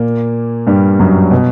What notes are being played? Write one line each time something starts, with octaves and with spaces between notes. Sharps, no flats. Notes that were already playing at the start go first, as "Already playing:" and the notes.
Already playing: A#2 A#3
G2 G3
F#2 F#3
B2